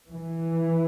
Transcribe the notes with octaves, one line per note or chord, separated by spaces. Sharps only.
E3